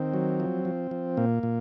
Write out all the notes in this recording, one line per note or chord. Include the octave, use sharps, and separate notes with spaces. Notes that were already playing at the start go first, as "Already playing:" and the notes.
Already playing: D#3 C4
F#3
F3
F3
F3
A#2 A#3
A#2